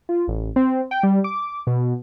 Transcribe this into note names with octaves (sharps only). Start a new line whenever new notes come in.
F4
A1
C4
G5
G3
D6
B2